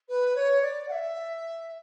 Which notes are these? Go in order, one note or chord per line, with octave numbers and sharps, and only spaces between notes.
B4
C#5
D5
F#5
E5